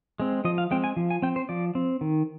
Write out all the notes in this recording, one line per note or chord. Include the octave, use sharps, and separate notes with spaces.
G#3 C4
F3 D#5
F5
G#3 C4 G5
G#5
F3
G#5
C4 G5
C5
F3 D5
C4
D#3